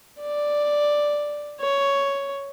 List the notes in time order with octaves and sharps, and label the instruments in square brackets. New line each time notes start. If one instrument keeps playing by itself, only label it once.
[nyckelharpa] D5
C#5